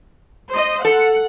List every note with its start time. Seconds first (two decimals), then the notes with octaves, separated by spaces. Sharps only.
0.50 C5 D#5
0.85 A4 F#5